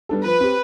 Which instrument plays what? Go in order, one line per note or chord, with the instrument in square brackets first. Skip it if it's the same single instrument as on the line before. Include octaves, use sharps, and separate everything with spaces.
[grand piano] G3 B3 D4 A4
[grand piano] F3 [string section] B4
[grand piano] C4 G4